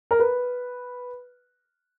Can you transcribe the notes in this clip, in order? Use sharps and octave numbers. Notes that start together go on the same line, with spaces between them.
A#4
B4